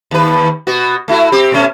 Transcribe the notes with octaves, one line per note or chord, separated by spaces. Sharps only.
D#2 B4
B2 B3 F#4
A3 E4 F#4
C4 G4
B2 A3 C#4